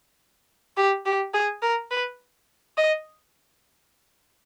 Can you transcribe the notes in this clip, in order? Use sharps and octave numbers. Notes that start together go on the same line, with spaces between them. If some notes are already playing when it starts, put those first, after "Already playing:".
G4
G4
G#4
A#4
B4
D#5